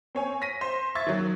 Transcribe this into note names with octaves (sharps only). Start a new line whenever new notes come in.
C4 C#5 G#5
A#6 B6 D#7
C5
E5 C#6 G#6 A6
D#3 F#3